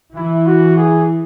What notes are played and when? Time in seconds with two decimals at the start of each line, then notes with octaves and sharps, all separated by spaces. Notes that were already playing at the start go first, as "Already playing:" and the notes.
0.16 E3 E4
0.47 F#4
0.77 G#4